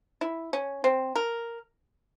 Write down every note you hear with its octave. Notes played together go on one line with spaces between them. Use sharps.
E4
C#4
C4
A#4